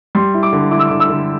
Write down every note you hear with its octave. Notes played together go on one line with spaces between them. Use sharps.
G3 C6
E4
D6
D3
E4 D6
E6
D3 D6
E6
D3